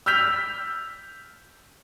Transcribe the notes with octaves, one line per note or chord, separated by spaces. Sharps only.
E6 F6 G6 B6 F7